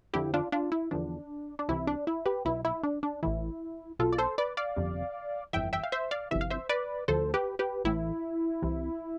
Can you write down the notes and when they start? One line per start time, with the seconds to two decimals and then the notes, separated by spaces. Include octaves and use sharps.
0.14 F2 D3 F3 E4 G4
0.34 D4 F4
0.52 D4 F4
0.72 E4
0.91 E2 D3 F3 D4
1.59 D4
1.69 C2 C3 E3 E4
1.87 D4
2.07 E4
2.26 G4 B4
2.45 B1 B2 E4
2.65 E4
2.83 D4
3.03 D4
3.23 A1 A2 E3 E4
3.99 B1 B2 F4 A4
4.13 D5
4.18 A4 C5
4.38 B4 D5
4.57 D5 F5
4.76 G1 F2 C3
5.53 G1 F2 E3 E5 G5
5.73 E5 G5
5.84 F5
5.92 C5 E5
6.11 D5 F5
6.31 G1 F2 C3 E3 E5
6.41 F5
6.50 C5 E5
6.69 B4 D5
7.08 D2 D3 F3 A4 C5
7.34 G4 B4
7.59 G4 B4
7.85 A1 A2 E3 E4
8.62 C2 C3 E3